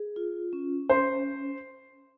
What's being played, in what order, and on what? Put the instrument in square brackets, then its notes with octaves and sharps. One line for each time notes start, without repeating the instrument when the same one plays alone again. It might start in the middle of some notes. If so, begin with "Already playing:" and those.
Already playing: [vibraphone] G#4
F4
C#4
[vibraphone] C#4 [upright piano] C5